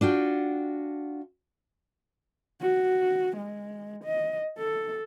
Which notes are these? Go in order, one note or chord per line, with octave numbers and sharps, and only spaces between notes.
D4 F4 F#4 G5
F#4
G#3
D#5
A4